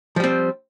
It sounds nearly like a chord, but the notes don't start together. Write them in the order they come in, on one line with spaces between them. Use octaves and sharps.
F3 G3 C4